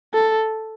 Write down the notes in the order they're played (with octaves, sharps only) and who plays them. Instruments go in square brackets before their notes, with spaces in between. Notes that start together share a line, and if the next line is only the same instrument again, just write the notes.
[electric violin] A4